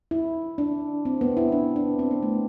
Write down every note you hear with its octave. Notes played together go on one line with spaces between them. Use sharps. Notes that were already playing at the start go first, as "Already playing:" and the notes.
E4
D4
C4
B3
E4
D4
D4
C4
B3
A3